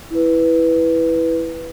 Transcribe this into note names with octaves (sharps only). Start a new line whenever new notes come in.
E4 B4